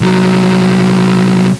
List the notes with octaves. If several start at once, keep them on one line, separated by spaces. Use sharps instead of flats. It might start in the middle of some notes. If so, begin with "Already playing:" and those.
C2 F#3